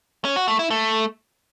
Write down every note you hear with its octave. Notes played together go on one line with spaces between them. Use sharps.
C#4
F#4
A3
E4
A3